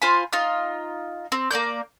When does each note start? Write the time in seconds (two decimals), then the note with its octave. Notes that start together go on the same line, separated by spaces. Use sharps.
0.02 F4 C5 G#5 B5
0.33 D#4 F4 F6
1.32 C4
1.51 A#3 B3 D5 G6